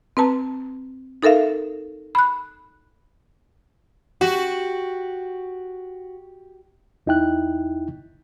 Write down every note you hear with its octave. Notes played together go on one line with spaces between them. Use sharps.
C4 B4 A5 A#5
D#4 A4 A#4 E5 F5
B5 F#6
F#4 G4
E2 D#4 E4 G5 F#6